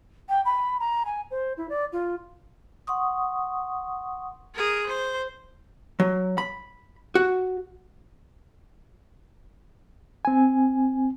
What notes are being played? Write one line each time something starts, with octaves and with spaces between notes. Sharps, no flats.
G5
B5
A#5
G#5
C5
E4
D5
F4
F#5 C6 C#6 D#6
G#4 A#4
C5
F#3
B5
F#4
C4 G#5